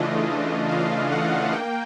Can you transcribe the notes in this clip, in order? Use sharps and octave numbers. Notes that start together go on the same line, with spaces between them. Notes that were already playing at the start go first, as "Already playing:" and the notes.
Already playing: C#3 E3 A3 D4 F4 D#5
F5
F#5
A#3 G5